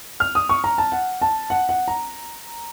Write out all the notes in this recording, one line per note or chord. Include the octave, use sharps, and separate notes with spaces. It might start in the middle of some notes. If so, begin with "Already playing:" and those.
F6
D#6
C#6
A#5
A5
F#5
A5
F#5
F#5
A#5